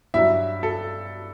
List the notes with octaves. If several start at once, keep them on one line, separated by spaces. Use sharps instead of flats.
G2 F#3 E4 E5
A4